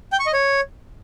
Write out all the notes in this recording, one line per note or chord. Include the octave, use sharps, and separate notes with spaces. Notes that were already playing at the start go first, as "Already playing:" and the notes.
G5
C#6
D#5
C#5